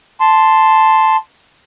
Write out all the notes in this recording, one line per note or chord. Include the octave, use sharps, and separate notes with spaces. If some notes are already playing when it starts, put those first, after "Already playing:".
A5 C6